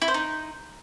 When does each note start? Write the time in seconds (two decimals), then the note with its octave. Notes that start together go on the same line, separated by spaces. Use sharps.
0.02 E4
0.08 C5
0.14 D#4